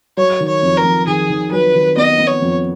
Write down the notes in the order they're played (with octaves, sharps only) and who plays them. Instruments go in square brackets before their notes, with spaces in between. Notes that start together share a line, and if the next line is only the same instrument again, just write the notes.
[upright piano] F#3 [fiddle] C#5
[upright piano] D#3
[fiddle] C#5
[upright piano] F2
[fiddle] A#4
[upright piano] F2
[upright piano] D#3 [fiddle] G#4
[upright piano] D#3
[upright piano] F#3 [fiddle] B4
[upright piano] D#3
[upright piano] B3 [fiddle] D#5
[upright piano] B3
[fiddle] C#5
[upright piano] F2